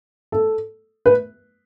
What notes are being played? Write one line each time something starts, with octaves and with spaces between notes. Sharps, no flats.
A4
B4